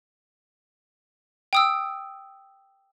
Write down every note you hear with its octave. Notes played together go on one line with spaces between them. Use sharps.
G5 D#6 E6